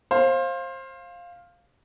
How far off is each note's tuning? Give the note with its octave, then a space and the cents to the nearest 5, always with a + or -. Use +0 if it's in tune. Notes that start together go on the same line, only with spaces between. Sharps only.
C5 +25 F5 +0